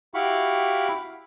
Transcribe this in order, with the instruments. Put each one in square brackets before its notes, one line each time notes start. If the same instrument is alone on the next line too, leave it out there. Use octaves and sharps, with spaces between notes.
[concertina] E4 F#4 G4 F5 B5 C#6